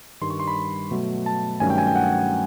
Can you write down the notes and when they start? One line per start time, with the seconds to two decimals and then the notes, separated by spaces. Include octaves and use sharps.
0.21 G2 D#3 G3 C6
0.30 C#6
0.40 C6
0.48 B5
0.91 B2 F#3 A3
1.26 A5
1.60 G2 D#3 F#3 A3 C#4 G#5
1.70 G5
1.78 G#5
1.87 G5
1.96 F#5